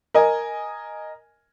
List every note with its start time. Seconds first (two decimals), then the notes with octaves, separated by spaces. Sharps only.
0.14 A#4 D#5 G#5